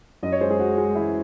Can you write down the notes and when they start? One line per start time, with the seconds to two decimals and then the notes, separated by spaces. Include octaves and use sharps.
0.23 F#2 D#5
0.32 C#5
0.41 G#3 C5
0.51 G#4
0.59 G#3 F#4
0.78 G#3
0.95 E3 E4